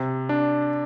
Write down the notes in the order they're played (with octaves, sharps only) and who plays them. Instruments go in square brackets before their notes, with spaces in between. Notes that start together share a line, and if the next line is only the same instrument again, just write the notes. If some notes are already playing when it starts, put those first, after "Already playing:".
Already playing: [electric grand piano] C3
D4